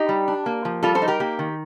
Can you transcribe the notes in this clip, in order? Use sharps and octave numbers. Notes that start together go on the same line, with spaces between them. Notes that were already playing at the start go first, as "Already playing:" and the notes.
Already playing: D#4 G4
G3
D4
A#3
F3
G3 F4 A4
A4 C5
D#4
G4 A#4
A#3 G4
D#3